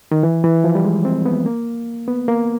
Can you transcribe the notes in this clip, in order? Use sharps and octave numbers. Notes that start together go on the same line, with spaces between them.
D#3
E3
E3
F3
G3
G#3
C4
B3
A#3
B3
A#3